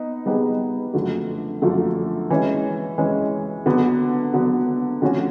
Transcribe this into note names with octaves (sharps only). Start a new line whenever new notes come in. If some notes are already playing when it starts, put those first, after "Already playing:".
Already playing: B3 D#4
G3 B3 D#4 G#4 B4
F#2 D3 F3 A3
F#2 D3 F3 A3
E3 G#3 C#4
E3 G#3 C#4
D3 F#3 B3
D3 F#3 B3
D3 F3 A3 C#4 F#4